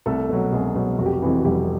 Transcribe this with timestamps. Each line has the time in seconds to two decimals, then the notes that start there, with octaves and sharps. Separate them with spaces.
0.06 C2 A3 A4
0.29 B2 F#3
0.52 C2 G#3 G#4
0.75 B2 F#3
0.98 F1 F#4
1.06 G4
1.13 F#4
1.22 F2 C3 E3
1.38 F#4
1.45 F1 G3 G4